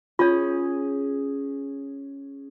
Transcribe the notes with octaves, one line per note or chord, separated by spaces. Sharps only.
C#4 F4 G#4 C#5